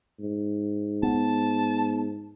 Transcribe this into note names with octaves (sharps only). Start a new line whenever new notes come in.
G#2
B3 A5